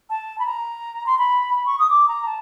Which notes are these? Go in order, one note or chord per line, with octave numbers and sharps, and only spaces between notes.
A5
B5
A#5
C6
B5
B5
C#6
D#6
D6
A#5
A5